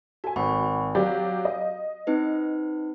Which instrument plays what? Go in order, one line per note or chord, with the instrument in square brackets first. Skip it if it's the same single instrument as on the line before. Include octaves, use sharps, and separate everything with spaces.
[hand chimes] F#4 [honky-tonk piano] A4 G#5
[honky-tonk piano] G#1 [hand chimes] F#5 B5 C#6
[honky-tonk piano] F#3 G4 D5 [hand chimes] F5
[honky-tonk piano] D#5
[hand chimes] C4 D#4 B4